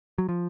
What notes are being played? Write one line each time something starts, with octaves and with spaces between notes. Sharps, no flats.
F#3
F3